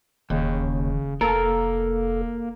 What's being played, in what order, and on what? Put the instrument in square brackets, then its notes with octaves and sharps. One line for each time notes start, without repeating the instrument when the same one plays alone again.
[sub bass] E1 [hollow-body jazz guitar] D#2 [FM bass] C#3
[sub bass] F1 [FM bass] A#3 [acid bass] A4 [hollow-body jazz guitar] A#4